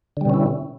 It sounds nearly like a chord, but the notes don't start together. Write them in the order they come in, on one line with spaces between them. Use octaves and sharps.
D3 G3 B2 C#4 E4